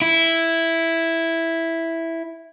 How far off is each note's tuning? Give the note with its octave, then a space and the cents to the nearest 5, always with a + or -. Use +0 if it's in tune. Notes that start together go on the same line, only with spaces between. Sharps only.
E4 +0